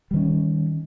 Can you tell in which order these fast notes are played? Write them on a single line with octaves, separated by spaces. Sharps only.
G3 D#3 C#4